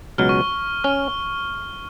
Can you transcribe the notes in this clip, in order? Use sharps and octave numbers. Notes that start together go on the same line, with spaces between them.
C#2 B2 F#3 F6
C#6
C#4 F6